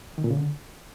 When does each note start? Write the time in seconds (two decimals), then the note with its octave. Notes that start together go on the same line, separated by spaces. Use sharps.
0.18 D#3
0.24 A#2
0.30 C#3
0.37 D3